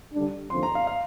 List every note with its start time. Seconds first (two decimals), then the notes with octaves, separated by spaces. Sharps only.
0.14 D3 G3 D4
0.50 D#2 D3 F3 C4 C6
0.63 A#5
0.75 F5
0.87 F5